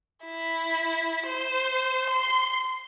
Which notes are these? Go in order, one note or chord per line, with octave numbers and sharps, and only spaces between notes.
E4
C5
C6